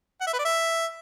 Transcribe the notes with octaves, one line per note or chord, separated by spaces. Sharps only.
F#5
E5
B4
D5
E5